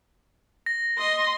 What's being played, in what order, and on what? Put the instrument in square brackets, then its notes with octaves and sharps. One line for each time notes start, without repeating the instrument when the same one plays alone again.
[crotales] A#6
[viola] D#5 C6